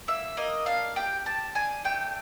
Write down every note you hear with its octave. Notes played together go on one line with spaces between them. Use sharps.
A#3 E5
A#3 D#5
D4 F5
G4 G5
G4 A5
D4 G#5
A3 G5